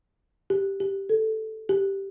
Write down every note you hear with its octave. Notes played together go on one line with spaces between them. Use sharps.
G4
G4
A4
G4